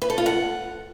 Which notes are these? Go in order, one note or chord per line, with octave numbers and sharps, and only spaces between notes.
B4
A4
F4
F#5